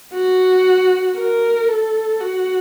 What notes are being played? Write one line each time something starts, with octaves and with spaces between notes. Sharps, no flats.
F#4
A#4
A4
F#4